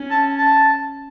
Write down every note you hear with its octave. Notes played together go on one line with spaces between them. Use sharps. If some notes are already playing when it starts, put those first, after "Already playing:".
Already playing: C#4
A5
A5